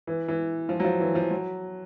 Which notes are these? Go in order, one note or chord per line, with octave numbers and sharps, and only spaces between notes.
E3
E3
F3
F#3
F3
E3
F3
F#3